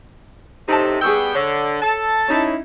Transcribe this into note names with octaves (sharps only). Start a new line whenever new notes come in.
A2 C3 D#4 A5
G3 B3 G#4 G5 C#6 E6
D3 C#5
A4 A5
C#4 D#4 E4